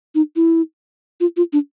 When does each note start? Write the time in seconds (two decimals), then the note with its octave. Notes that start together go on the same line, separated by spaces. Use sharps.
0.15 D#4
0.36 E4
1.21 F4
1.37 F4
1.53 D4